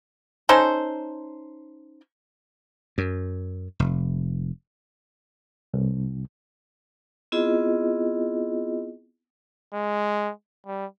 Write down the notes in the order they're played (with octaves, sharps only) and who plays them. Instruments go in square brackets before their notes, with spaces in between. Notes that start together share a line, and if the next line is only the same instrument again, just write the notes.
[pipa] C#4 D#4 A4 C5
[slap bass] F#2
F1
[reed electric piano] C2
[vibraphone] B3 C4 E4 F4 G#4 D#5
[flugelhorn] G#3
G3